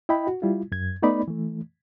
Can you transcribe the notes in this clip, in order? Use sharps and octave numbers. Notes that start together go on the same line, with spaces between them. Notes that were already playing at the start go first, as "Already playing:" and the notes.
E4 D#5 G5 B5
F#4
G3 E4 F4
F#2 G#6
A3 B3 D#4 D5 B5
E3 A3